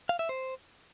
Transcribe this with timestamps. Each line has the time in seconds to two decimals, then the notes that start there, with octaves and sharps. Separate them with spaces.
0.09 F5
0.19 E5
0.29 C5